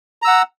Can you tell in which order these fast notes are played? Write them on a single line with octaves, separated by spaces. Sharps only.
A#5 E6 F#5